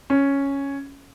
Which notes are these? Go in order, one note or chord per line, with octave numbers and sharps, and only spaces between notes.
C#4